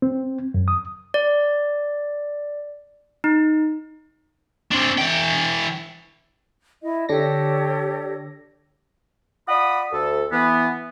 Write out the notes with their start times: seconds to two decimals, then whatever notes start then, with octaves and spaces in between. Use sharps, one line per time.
0.02 C4
0.54 F#2
0.68 D#6
1.14 D5
3.24 D#4
4.72 C4 D4
4.98 E3 G5
6.82 E4 D#5
7.09 D3 D4 G4 A4 C#5 A#6
9.49 F4 D5 F#5 B5 D#6
9.92 D2 A4
10.32 E3 B3